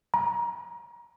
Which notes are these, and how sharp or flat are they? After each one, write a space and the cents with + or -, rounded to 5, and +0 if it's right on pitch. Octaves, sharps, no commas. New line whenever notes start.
A#5 +30